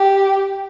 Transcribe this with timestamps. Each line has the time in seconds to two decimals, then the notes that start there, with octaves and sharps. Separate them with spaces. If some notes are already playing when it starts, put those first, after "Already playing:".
Already playing: G4